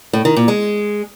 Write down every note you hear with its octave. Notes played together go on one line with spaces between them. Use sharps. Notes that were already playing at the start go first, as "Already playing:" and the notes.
A2
D#3
A#2
G#3